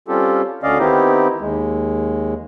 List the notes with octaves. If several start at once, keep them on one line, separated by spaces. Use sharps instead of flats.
G3 C4 C#4 F4 G4 A4
D2 D3 C#4 D5 D#5 F5
D#3 B3 C4 D#4 E4 G4
D#2 G#3